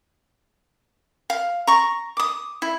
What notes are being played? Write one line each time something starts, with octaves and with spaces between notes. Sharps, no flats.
F5
A#5 C#6
D6 D#6
E4